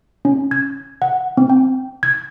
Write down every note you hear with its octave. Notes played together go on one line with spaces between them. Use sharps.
C#4
G#6
F#5
C4
G5
G#6